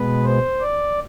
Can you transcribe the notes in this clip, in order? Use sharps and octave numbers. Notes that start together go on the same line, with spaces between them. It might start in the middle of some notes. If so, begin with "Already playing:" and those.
Already playing: B2 G#3 B3 B4
C5
D5